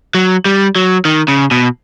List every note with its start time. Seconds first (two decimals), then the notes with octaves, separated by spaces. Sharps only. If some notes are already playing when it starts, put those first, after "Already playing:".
0.15 F#3
0.45 G3
0.76 F#3
1.05 D#3
1.28 C#3
1.51 B2